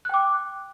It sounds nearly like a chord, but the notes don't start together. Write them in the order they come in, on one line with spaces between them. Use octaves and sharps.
F#6 G5 D6